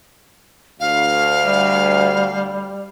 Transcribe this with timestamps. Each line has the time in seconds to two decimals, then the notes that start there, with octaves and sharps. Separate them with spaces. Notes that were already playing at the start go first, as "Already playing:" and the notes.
0.80 D2 F5
1.45 G3